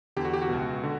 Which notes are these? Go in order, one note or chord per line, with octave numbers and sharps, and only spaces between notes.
E2 D3 G4
F#4
G4
F#4
C#2 B2
D3